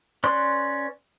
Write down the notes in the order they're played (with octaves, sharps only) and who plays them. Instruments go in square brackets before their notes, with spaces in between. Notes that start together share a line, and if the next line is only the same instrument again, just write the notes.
[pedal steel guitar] C#4 B4 D5 C6 F#6